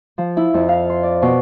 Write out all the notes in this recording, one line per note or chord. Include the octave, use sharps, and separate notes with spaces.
F3
E4
F2
F5
C6
D5
B2